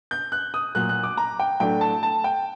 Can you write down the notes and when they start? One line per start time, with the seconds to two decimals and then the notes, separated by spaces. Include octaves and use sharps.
0.11 G6
0.32 F#6
0.54 D#6
0.75 A#2 F#3 A#3 F#6
0.89 F#6
1.03 D6
1.17 A#5
1.40 G5
1.60 A2 F#3 A3 D4 G5
1.81 A5
2.03 A5
2.24 G5